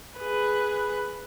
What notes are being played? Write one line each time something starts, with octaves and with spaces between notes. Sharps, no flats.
G#4 B4